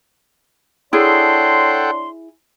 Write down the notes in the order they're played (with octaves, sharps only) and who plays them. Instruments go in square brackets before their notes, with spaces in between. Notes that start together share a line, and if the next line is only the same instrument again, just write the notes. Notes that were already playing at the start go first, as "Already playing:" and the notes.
[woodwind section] D4 C#5 C6 [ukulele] E4 G#4 [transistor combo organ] A4 F#5 G5